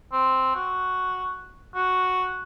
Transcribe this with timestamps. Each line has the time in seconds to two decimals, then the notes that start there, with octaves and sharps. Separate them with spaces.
0.12 C4
0.55 F#4
1.75 F#4